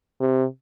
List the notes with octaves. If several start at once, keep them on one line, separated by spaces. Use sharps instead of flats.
C3